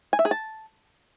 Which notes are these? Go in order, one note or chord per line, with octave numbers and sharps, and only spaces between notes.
G#5
E5
G#4
A5